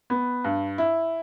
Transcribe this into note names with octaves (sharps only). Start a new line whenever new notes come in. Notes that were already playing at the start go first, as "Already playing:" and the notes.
B3
G2
E4